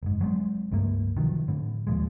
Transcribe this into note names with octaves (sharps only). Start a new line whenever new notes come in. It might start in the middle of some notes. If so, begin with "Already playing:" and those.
F#1 G#2
F#3 G#3 A3 C4
C#2 G2 A3 A#3
C3 D#3 F3 F#3
A2 D3
D#2 A#2 F3 G#3